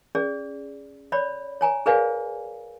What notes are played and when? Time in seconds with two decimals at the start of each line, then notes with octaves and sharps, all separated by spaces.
0.15 C#4 G#4 D5
1.12 C#5 D5 B5
1.61 C#5 G#5 A#5
1.86 G#4 A#4 B4 D5 F5 G#5